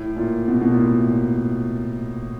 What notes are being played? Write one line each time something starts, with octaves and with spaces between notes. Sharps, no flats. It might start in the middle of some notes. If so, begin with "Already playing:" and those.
Already playing: A2
A#2
B2
B2
A#2
A2
A#2